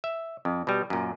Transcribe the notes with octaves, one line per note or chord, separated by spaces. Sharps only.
E5
F2
B2 G3
F#2 A#2